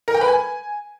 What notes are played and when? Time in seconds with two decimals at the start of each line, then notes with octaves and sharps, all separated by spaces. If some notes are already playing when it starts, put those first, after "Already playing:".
0.08 A#4
0.14 G5
0.21 B4
0.28 G#5